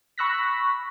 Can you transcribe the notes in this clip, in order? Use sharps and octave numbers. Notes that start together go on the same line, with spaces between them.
B5 C#6 E6 F#6 A#6 B6